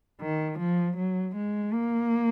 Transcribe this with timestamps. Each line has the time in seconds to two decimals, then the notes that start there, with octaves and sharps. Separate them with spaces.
0.21 D#3
0.59 F3
0.97 F#3
1.36 G#3
1.73 A#3